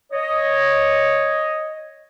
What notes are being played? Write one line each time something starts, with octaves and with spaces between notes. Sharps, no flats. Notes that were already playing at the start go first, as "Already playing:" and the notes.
C#5 D#5